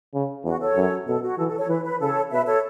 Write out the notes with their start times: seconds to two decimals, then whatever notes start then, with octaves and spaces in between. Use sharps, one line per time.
0.14 C#3
0.45 E2 F#4
0.60 A4 C#5
0.76 F#2
1.07 B2 A4
1.23 F#4
1.37 E3 A4
1.48 A4
1.58 A4 C#5
1.69 E3 B4
1.84 B4
2.00 C#3 A4 C#5
2.31 B2 B4 E5
2.47 A4 C#5